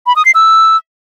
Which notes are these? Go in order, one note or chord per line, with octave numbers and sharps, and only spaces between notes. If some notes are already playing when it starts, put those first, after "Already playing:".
B5
D#6
C7
E6